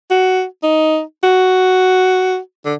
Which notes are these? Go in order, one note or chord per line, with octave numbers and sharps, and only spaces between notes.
F#4
D#4
F#4
D3